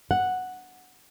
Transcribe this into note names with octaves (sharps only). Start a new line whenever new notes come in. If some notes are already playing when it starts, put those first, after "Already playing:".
F#5